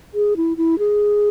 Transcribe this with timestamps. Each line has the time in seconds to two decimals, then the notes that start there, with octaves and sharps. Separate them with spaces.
0.14 G#4
0.37 E4
0.57 E4
0.79 G#4